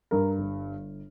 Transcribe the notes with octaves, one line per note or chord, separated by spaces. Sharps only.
G2 A#4
G1